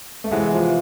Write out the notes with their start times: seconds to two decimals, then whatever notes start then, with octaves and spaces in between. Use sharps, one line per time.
0.24 A3
0.31 C3 E3 G#3 B3
0.53 F3